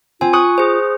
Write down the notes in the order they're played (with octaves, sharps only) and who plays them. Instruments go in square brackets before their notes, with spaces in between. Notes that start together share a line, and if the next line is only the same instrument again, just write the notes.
[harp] C4 [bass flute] F4 [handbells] G#5
[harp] C#6 D#6 F#6
[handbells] G#4 C5